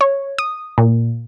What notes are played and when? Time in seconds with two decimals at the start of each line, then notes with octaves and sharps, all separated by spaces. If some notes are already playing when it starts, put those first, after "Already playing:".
0.01 C#5
0.38 D#6
0.78 A#2